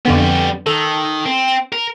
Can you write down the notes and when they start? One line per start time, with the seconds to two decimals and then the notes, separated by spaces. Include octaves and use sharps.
0.05 F2 D3 G3 B3 C#4
0.66 D#3 A4
1.26 C4
1.72 A#4